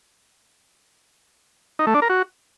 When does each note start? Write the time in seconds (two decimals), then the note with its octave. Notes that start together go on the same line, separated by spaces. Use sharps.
1.79 D#4
1.87 A3
1.94 D4
2.02 A#4
2.09 F#4